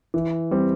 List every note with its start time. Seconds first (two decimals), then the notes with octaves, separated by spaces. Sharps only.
0.14 E3
0.51 G3 C4